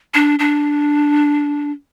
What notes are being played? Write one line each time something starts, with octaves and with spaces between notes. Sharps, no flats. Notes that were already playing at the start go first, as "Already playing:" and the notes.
D4
D4